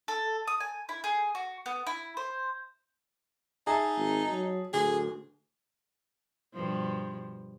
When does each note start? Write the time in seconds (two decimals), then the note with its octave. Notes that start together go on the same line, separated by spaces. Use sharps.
0.08 A4
0.47 D#6
0.60 G#5
0.89 E4
1.04 G#4
1.35 F#4
1.66 B3
1.87 E4
2.17 C5
3.67 D#4 G#4 E5 A5
3.97 G#1
4.31 F#3
4.73 D1 D2 G#4 G7
6.53 G2 B2 F3